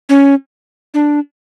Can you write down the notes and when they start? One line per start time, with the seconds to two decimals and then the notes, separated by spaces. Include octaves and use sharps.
0.09 C#4
0.94 D4